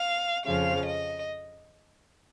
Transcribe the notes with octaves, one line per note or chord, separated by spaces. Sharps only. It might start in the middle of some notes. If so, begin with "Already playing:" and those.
Already playing: F5
F2 C#3 F3 F5
D#5